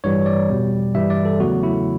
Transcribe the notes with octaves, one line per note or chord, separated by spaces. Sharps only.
A1 G2 E3 G3 C#5
D5
E2 B2 G3
G2 E3 G3 E5
D5
A4
E2 C#3 F#3 A3 F#4
E4